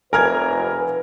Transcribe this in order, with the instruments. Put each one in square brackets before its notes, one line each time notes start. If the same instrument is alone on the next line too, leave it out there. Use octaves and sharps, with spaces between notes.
[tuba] F1 [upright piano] A#4 [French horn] B4 [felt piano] G#5 F6 G#6